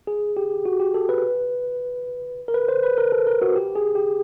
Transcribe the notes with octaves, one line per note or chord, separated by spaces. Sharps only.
G#4
G4
F#4
G4
A4
B4
A#4
B4
C5
B4
A#4
A4
A#4
F#4
G4
G#4
G4